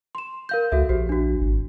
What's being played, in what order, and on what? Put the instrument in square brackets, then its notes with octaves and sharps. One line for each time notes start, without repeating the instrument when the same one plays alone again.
[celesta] C6 E7
A#4 F5 G6
[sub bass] C#2 [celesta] F#4 A4 E5
[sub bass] A#1 [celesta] F#4 G4 C5
[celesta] D4 F#4
[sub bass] G#1